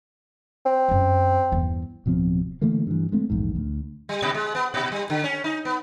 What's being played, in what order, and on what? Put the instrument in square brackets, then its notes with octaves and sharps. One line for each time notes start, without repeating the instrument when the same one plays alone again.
[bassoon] C4
[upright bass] F#2 F4
E2 G2
[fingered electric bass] D1 B2 F3 C4
D3 E3 A3 A#3
G2 E3
G#3 A3 C4
A#1 E2 G#2
D2
[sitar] G3
A#2
G#3
B3
A#2
G3
D3
C#4
D#4
B3